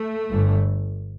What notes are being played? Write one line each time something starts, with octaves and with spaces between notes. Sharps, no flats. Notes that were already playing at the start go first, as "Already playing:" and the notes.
Already playing: A3
G1 G2